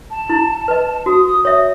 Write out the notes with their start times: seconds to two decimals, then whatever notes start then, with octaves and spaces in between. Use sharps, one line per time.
0.11 A5
0.30 E4
0.68 B4 D#5
1.06 F#4 D#6
1.26 D#6
1.45 C#5 E5 D#6